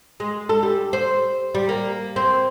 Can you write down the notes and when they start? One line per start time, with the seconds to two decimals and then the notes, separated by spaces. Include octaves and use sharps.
0.20 G#3
0.49 A4
0.63 G3
0.93 C5
1.55 G3
1.69 A#3
2.16 C4